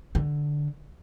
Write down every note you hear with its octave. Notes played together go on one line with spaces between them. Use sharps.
D3